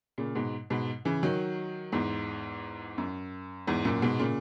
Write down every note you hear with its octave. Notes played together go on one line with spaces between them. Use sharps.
A#2 C#3
G#2 B2
G#2 B2
C#3 E3
D#3 F#3
E2 G#2
F#2
E2 G#2
F#2 A#2
G#2 B2
A#2 C#3